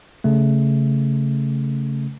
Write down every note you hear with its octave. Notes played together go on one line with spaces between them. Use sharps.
C#3 A3